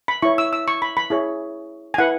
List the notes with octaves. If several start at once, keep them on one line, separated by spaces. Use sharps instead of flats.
B5
E4 C#5 C#6
E6
E6
C#6
B5
B5
E4 G#4 C#5
G#5
E4 B4 F#5